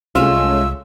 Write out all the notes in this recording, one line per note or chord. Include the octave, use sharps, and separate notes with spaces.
C2 G#3 A3 C#4 F4 E6